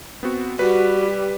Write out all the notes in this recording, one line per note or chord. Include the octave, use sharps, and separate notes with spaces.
B3 C4 F#4
G3 F#4 B4